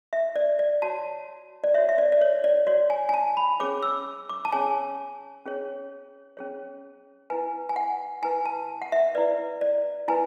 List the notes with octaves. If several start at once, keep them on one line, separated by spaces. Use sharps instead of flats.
E5
D5
D5
F#4 C#5 A5
D5
F#4 C#5 E5
E5
D5
D5
C#5
D5
F#4 C#5 D5
G#5
G#5
A5
B5
C#4 G#4 C#5 D6
E6
D6
A5
C#4 G#4 C#5 G#5
C#4 G#4 C#5
C#4 G#4 C#5
E4 B4 G#5
G#5
F#5
E4 B4 G#5
A5
F#5
E5
E4 B4 D5
D5
E4 B4 G#5